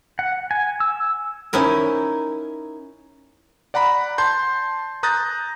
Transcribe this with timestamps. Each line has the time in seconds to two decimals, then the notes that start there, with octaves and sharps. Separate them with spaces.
0.19 F#5
0.51 G#5
0.80 E6
1.53 C#4 D#4 E4 A#4
3.74 D5 F#5 A#5 B5
4.18 A5 C6 G6
5.03 A#5 D#6 F#6 G6 A6 A#6